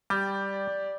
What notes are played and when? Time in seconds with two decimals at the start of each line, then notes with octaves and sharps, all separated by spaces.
0.10 G3 G4 D5